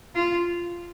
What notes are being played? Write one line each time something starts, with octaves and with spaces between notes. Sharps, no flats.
F4